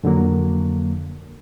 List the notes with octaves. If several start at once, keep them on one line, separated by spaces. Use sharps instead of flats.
F2 D3 F#3 A#3